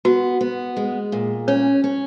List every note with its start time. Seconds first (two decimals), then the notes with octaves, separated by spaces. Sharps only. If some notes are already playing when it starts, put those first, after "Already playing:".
0.05 B3 F#4
0.41 B3
0.77 G#3
1.12 A#2
1.48 C#4 C#5
1.84 C#4